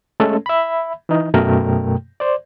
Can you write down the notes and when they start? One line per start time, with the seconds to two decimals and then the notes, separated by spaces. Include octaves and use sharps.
0.20 G#3 A3 C#4 A4
0.46 E5 B5
1.09 E3 D#4
1.34 F#2 B2 A3 A#4 G5
2.20 C5 D5